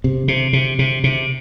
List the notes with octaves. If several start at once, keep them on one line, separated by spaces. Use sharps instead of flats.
C3
C3
C3
C3
C3